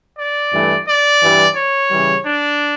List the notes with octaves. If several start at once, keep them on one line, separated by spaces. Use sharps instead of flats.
D5
G2 E3 A3
D5
G2 E3 G3
C#5
C#3 E3 G3
D4